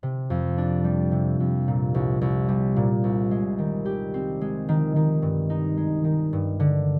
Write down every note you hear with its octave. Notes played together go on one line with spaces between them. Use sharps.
C3
F2
D4
G3
C3
F2
A#2
C2
C2
G3
A#2
C2
G#3
D#3
G4
C4
G#3
D#3
D#3
G2
D#4
G#3
D#3
G2
D3